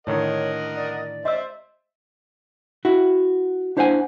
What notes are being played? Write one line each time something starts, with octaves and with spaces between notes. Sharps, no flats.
A2 D3 D#3 A#4 C#5 D#5 F#5
D5
C5 D#5 E5 E6
E4 F#4
D4 E4 C5 F5 F#5 G#5